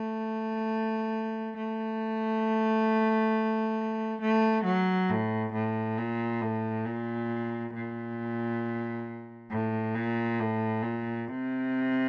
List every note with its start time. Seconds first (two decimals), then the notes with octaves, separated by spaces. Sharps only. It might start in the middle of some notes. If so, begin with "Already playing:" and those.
Already playing: A3
1.57 A3
4.21 A3
4.65 F#3
5.10 A2
5.53 A2
5.98 A#2
6.41 A2
6.86 A#2
7.74 A#2
9.50 A2
9.95 A#2
10.39 A2
10.83 A#2
11.28 C3